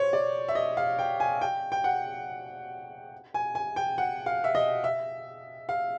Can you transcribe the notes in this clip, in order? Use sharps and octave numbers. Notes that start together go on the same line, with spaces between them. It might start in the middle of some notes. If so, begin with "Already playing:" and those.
Already playing: C5 C#5
D5
E5
D#5
F5
G5
G#5
G5
G5
F#5
G#5
G#5
G5
F#5
F5
E5
D#5
E5
F5